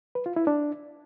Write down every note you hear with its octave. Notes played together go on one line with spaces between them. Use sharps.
B4
F4
E4
D4